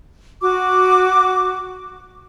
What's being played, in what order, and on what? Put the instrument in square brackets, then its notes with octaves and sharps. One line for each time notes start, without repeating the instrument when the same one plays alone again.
[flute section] F#4 D6